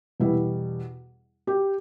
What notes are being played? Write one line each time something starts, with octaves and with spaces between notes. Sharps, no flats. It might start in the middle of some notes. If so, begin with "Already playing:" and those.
E2 B2 G3 B3 E4
G4